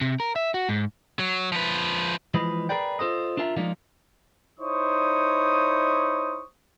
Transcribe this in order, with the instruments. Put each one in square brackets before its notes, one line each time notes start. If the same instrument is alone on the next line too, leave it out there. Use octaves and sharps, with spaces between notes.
[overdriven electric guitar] C3
A#4
E5
F#4
G#2
F#3
F3 B4
[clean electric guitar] E3 F3 G#3 B4 D#5
G#4 A#4 B4 D5 G5
F4 A4 C5 D#5
D4 F4 A#4 E5 A5
F3 G#3 A#3 D4 D#4 F4
[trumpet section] D#4 E4 C5 C#5 C#6 D#6